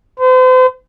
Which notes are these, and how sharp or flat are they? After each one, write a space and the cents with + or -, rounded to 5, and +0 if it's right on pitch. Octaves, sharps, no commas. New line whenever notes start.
C5 -40